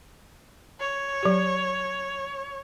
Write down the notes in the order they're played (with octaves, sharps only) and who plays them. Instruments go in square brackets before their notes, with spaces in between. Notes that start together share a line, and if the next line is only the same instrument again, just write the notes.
[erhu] C#5
[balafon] F#3 G4